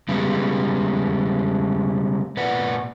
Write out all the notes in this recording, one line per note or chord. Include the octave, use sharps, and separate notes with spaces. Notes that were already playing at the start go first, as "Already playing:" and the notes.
C#3 G3 G#3 B3
A#2 B4 D5 F#5